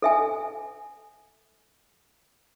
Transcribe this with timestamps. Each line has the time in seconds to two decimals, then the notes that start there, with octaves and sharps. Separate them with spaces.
0.02 A4 E5 G#5